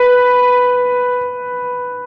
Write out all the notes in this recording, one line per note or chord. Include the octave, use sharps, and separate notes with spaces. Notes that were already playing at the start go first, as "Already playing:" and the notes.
Already playing: B4